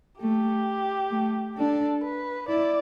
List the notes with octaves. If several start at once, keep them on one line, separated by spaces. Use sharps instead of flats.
A3 G4
A3
D4 A4
B4
E4 D5